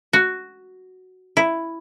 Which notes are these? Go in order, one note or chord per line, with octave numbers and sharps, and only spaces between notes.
F#4
E4